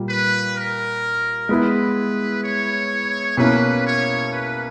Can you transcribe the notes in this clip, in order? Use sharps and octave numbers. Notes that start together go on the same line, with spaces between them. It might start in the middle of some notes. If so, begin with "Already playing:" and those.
Already playing: A#2 G3 A#3
B4
A#4
G#3 B3 E4 B4
C#5
B2 A#3 C#4 E4 B4
C#5
B4